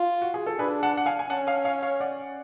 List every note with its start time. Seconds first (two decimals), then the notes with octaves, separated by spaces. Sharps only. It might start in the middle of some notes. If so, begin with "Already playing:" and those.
Already playing: F4
0.22 F#4
0.34 G#4
0.46 A4
0.59 D4 G#4 B4
0.83 F#5 A5
0.97 F#5
1.06 F5 G#5
1.19 G#5
1.30 C#4 F#5 A5
1.47 F5 G#5
1.65 C#5 F5
1.82 C#5 F5
2.00 D5 F#5